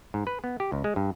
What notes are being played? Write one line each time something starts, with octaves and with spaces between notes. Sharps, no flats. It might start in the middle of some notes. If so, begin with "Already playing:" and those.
G#2
B4
B3
G4
C#2
G#3
G2